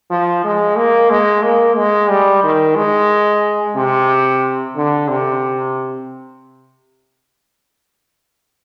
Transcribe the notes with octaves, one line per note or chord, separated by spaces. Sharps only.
F3
G#3
A#3
G#3
A#3
G#3
G3
D#3
G#3
C3
D3
C3